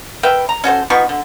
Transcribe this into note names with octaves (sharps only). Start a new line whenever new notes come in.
A#4 B4 E5 G5
A#5
C#4 F#4 A4 C5
F3 B3 D#4 C#6
D3